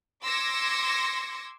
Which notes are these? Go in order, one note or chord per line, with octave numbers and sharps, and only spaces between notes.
C6 D6 E6 G#6 A#6 C#7